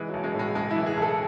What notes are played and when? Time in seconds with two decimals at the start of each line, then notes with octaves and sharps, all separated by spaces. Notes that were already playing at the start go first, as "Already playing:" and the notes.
Already playing: E3 G#3
0.08 B1 F#3
0.24 G#3
0.34 A2 G#3
0.55 B1 G#3
0.70 E4
0.76 E3
0.86 G#4
0.97 B1
1.02 A4